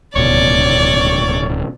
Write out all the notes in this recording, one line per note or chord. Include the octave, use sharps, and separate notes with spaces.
D1 C#2 B2 C#5 D5